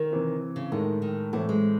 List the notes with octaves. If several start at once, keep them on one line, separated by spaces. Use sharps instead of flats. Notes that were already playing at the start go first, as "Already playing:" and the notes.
Already playing: D#3
C3 E3 C4
C#3
A2 D#3 G#3 D#4
D#3
A2 E3 A3 C4
G#3